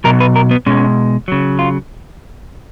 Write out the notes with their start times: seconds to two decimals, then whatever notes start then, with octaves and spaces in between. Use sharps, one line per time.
0.04 B2 F#3 A#4
0.20 B4
0.36 A#4
0.51 B3
0.66 B2 G#3 C#4
1.28 C#3 F#3
1.59 F4